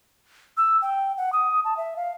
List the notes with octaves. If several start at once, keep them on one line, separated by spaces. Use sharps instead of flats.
E6
G5
F#5
D#6
A5
E5
F5